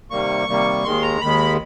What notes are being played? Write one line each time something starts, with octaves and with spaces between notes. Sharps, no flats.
C3 D#3 G3 A#3 C#6
C3 D#3 G3 A#3
D#2 D#3 G#3 C6
A#5
D#2 D#3 G#3 B5